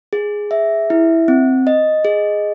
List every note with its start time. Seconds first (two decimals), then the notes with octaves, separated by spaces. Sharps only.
0.13 G#4
0.51 E5
0.90 E4
1.28 C4
1.67 D#5
2.05 G#4